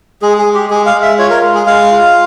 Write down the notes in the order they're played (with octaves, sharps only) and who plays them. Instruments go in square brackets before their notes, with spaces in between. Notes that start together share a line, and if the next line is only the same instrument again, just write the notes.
[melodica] G#3 G#4
G#4
G#3
G4
G#3 G#4
F5
G#3
E5
F4 C#5
A#4
G#3
G#4
G#3 F5
F4